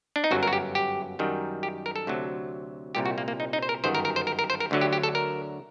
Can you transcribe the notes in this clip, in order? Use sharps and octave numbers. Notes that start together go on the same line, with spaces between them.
D4
D#4
G1 F#2 F#3 F#4
A#4
F#4
G4
G4
F#2 D#3 G3
G4
A#4
A4
D2 C3 F#3
C2 A#2 G3 G4
F#4
A#3
A#3
D#4
D#4
C5
A#4
G1 F#2 D#3 C5
A#4
A#4
C5
A#4
A#4
C5
A#4
D2 D3 F#3
G4
G4
A4
A#4